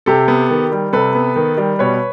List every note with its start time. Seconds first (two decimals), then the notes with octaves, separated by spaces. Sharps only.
0.06 C3 G4 A4
0.28 B3
0.50 D#3
0.72 G3
0.93 C3 A4 B4
1.15 B3
1.36 D#3
1.58 G3
1.79 B2 B4 C#5